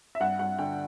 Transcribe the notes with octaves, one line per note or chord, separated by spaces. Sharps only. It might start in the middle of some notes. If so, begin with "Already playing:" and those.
E5
G2 F#5
G2 F#5
D3 G5